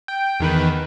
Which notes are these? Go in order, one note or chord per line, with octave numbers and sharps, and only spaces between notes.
G5
E2 D#3 B4